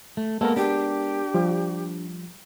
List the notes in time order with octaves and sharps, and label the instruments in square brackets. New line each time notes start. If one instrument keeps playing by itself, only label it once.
[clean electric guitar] A3
[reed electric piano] G#3 B3 A#4 [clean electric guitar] A#3 A4
[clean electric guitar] D4 [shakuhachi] G4
[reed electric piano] F3 G3